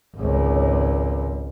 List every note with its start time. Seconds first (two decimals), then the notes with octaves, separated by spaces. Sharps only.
0.17 G#1 C#2